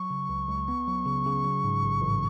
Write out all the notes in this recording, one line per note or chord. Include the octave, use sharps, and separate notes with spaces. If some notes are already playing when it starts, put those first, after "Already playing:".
Already playing: F#3 C#6
C#3
C#2
C#2
B3
F#3
C#3
C#3
F#3
G#2
A1
A1